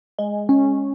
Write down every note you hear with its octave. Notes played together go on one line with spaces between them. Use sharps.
G#3
C#4